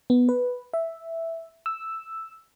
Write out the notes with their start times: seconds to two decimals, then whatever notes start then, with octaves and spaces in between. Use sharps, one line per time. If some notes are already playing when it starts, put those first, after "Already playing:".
0.10 B3
0.29 B4
0.74 E5
1.66 E6